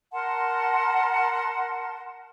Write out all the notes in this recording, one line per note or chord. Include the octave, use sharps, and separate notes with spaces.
A#4 F#5 A5 C6